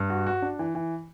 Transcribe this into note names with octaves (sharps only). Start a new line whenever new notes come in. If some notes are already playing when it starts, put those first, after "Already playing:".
Already playing: G2
F#4
F#4
D4
E3
E3